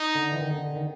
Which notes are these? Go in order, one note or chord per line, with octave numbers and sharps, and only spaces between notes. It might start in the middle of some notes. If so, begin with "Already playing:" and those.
Already playing: D#4
D3
E3
D#3
D3
D#3